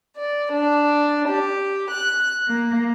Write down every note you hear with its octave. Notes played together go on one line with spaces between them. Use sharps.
D5
D4
G4
F#6
A#3